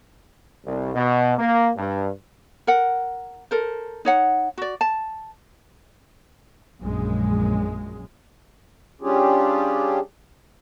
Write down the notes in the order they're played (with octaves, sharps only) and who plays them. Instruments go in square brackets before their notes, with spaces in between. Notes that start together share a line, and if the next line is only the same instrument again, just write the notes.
[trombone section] C2
B2
A#3
G2
[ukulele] A#4 F#5
A4 A#4 C5
D#4 C#5 F#5
F#4 D5
A5
[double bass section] A#1 F#2 A#2 G#3
[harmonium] G3 C#4 D4 F4 G4 G#4